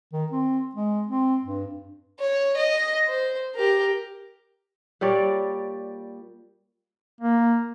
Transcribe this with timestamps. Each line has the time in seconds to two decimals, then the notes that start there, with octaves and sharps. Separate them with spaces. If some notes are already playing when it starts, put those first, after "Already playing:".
0.13 D#3
0.32 C4
0.75 G#3
1.08 C4
1.44 G2
2.20 C#5
2.57 D#5
3.07 C5
3.55 G4 A#4
5.01 A#2 G3 C#5 D5
7.21 A#3